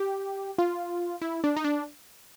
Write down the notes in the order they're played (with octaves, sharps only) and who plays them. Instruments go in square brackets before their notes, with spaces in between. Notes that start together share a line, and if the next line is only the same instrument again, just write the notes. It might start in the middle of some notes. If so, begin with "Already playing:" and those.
Already playing: [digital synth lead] G4
F4
E4
D4
D#4
D4